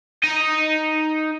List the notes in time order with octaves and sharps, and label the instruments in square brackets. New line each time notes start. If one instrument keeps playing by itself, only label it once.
[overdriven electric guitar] D#4 D#5